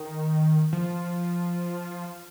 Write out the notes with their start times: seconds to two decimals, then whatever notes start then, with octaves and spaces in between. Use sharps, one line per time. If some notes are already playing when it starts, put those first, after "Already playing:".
Already playing: D#3
0.73 F3